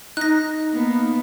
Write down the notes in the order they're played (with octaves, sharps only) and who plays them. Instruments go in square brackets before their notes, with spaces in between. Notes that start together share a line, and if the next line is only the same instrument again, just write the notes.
[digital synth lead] D#4 [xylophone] F#6 A#6
[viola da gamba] A#3 B3